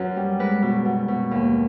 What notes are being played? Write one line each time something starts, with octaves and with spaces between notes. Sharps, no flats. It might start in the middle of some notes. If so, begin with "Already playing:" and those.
Already playing: F#2 B4
G3
G#3 B4
B2
B2
B2
D#2